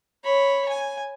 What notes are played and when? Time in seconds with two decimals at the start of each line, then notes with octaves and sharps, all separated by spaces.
0.25 C#5 B5
0.69 G#5